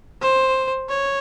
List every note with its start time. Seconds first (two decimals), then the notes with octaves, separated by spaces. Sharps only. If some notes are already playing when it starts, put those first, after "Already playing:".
0.22 C5
0.90 C#5